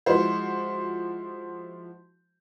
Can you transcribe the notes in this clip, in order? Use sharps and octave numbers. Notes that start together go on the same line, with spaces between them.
F3 G#3 E4 F#4 C5